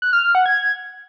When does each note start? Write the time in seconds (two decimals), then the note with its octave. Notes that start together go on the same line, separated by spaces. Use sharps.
0.02 F#6
0.13 F6
0.24 F6
0.35 F#5
0.46 G#6